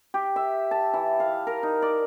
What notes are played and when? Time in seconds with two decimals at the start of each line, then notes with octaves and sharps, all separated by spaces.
0.14 G4
0.36 E5
0.71 A5
0.94 E3
1.20 F5
1.47 A#4
1.63 D#4
1.82 D5